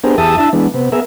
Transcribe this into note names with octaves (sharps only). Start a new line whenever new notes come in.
B3 C4 D4 G4 G#4 A#4
E2 G4 G#4 E5 A5 D#6
D4 E4 E5 A5
E3 G#3 B3 D4
C3 B3
B3 G#4 A#4 E5